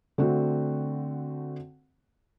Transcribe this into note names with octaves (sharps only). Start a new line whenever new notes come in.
D3 A3 C4 F#4